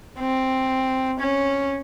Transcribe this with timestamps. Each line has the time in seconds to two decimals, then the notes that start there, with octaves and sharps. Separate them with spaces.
0.19 C4
1.20 C#4